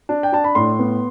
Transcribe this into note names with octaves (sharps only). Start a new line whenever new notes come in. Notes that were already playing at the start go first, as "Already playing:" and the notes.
D4
G5
D4 A5
B5
A2 C6
B3